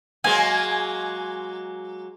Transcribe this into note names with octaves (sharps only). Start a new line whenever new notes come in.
F#3 G#3 A#3 G#5